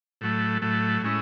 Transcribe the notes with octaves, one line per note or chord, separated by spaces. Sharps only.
A2 F#3 A3
A2 F#3 A3
A2 G#3 C#4 E4